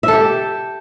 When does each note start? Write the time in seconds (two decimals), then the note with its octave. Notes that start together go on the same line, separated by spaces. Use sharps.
0.03 E5
0.08 A4
0.13 G4